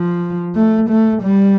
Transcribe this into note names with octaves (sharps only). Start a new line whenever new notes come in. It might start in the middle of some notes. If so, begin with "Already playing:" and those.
Already playing: F3
A3
A3
G3